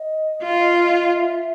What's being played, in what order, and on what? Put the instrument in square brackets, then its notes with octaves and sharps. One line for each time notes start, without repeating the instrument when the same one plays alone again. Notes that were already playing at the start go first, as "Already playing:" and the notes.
Already playing: [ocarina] D#5
[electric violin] F4
[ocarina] D#5
E5